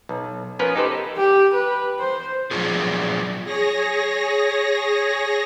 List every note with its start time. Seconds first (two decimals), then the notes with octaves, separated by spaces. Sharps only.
0.09 B1
0.59 F3 B3 C#4 A#4 B4
0.76 D#4 G4 A4 B4 C5
1.17 G4
1.53 B4
1.99 C5
2.51 F3 F#3 D4 F4 G#4
3.44 G#4 C#5 A#6